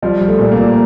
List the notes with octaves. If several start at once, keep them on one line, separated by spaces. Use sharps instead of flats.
F3 G3
F3
A3
A#2
A#3
A#2